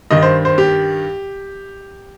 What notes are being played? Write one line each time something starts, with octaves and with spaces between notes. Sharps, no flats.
G2 D#3 D#5
C5
C5
G4